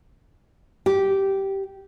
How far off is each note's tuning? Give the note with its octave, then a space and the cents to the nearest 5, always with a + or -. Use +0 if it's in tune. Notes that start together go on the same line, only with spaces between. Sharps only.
G4 -10